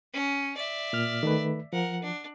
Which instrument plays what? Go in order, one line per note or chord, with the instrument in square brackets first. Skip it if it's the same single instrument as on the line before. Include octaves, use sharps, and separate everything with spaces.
[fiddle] C#4
D5 E5
[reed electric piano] A#2 F6
D#3 A3 B4
[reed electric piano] F3 [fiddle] A#4 F#5
[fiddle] D4